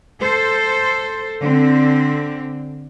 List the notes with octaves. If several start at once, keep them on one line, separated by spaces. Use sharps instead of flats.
A4 C5
D3 C4